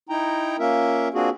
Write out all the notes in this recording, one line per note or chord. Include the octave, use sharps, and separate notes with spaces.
D#4 E4 G5 A#5
A#3 C#4 F4 A#4 E5
A#3 C4 D4 F4 F#4 G#4